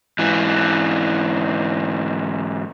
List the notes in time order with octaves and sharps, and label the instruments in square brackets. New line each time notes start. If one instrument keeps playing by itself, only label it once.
[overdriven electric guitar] G#2 E3